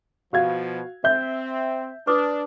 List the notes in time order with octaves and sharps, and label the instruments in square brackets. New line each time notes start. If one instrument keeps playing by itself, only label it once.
[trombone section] B2 F3 [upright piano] F#4 F5 G#6
[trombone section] C4 [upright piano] E5 G6
[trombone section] D4 [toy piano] B4 D6 D#6